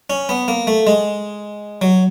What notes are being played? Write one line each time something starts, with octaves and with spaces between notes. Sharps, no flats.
C#4
B3
A#3
A3
G#3
F#3